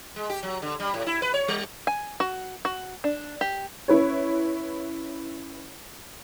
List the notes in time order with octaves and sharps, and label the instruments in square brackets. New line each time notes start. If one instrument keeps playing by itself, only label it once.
[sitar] G#3
G4
F#3
D3
G3
A2
E4
B4
C#5
G3
[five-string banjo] G#5
F#4
F#4
D4
G4
[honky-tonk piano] C#4 E4 B4 C#5